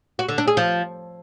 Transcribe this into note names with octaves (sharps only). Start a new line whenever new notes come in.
F#4
D3
D4
G#4
F3